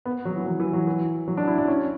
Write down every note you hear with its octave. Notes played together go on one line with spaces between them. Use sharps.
B3
F#3
E3
F#3
E3
F#3
E3
F#3
D4
E4
D4
C#4